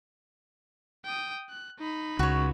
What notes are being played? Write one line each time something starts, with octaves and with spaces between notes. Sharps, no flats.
G5 D#6
F#6
D#4 B5
C#2 F#4 C#5